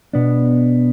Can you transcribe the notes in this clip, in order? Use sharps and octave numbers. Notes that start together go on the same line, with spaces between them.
B2 B3 D4